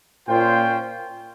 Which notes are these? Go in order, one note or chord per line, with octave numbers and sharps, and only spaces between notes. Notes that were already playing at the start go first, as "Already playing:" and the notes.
A#2 C#4 F4 C5 G5